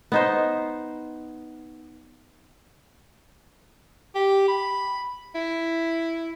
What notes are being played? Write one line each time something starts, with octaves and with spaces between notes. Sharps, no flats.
B3 D#4 C5
G4
B5
E4